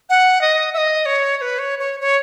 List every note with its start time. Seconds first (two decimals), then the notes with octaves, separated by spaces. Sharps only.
0.10 F#5
0.41 D#5
0.74 E5
0.78 D#5
1.06 C#5
1.38 C#5
1.41 B4
1.59 C#5
1.79 C#5
2.00 C#5